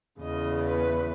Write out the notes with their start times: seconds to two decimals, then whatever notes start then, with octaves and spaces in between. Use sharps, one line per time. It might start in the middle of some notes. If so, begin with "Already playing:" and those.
0.20 E2 C#3 E3 D#5
0.63 B4